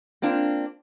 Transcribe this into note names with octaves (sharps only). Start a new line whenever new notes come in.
A#3 C4 D4 F4